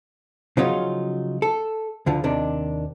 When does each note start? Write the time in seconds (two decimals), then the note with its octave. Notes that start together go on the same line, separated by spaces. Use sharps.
0.57 C#3 F3 F#3 C#4 D#4 F4
1.42 A4
2.06 D2 D3 F3
2.24 D#2 C3 D#3 D4